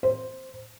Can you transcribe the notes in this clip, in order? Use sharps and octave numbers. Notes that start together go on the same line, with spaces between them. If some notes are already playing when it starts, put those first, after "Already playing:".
C5